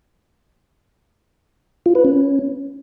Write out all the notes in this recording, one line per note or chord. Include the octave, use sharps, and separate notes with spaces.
F4
B4
C#4